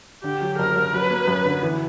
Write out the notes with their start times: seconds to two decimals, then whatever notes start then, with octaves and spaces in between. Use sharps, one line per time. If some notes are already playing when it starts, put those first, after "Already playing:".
0.23 D3 G4
0.41 F#3
0.58 F#1 A#4
0.76 F#2
0.93 F#3 B4
1.10 A#3
1.27 F#2
1.45 D3
1.63 E3